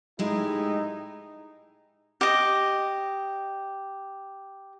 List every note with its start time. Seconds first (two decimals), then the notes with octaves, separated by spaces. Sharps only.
0.19 A2 G#3 D#4 E4 G4
2.21 G4 D#5